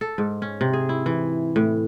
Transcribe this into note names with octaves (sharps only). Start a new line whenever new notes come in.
A4
G#2
C#4
C3
G#4
E4
E3
A2